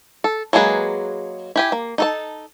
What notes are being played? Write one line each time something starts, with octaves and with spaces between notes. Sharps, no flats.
A4
F#3 G#3 A#3 G#4 B4
E4 G4 G#5
A#3
D#4 A4 A5